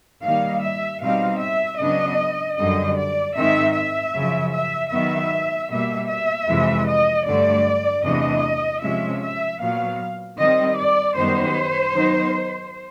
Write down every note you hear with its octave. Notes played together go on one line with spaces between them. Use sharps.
D#3 G3 A#3 D#4 F5
E5
B2 G3 C4 D#4 F5
E5
C#3 F#3 B3 D4 D#5
F#2 D3 G3 D#5
D5
G#2 D#3 G#3 C4 D#4 E5
E5
F#2 C#3 F3
E5
D#3 F#3 B3 E5
B2 G3 A#3 E5
E5
F2 C3 E3 G#3
D#5
G2 D3 F#3 A3 D5
E2 C3 E3 A3 D4 D#5
C3 F3 G#3 C#4 E5
E5
A#2 F#3 B3 F5
D#3 G3 C4 D#5
D5
F#2 D#3 G3 B3 D#4 C5
D#3 F#3 B3 D#4